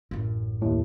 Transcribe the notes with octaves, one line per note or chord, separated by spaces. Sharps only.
A1 F#2
D#2 A2